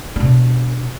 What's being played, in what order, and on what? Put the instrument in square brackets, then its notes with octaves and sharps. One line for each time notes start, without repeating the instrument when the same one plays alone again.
[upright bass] B2 D4